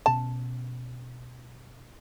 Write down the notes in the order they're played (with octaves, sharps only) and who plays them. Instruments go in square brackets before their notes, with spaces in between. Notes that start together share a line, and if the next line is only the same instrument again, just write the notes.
[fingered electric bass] B2 C#4 [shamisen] A5